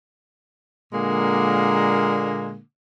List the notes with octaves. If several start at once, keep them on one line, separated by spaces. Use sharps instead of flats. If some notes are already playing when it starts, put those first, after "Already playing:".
A#2 D3 G#3 A#3